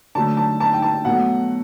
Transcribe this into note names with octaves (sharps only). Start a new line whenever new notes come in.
D3 F#3 A3 A5
A5
A5
G5
A5
B2 F#3 A3 F#5